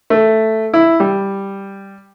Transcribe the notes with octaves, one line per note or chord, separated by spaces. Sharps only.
A3
E4
G3